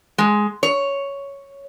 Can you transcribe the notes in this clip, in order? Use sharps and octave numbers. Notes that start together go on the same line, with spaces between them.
G#3
C#5